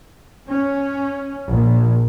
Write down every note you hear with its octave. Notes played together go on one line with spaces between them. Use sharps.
C#4
A#1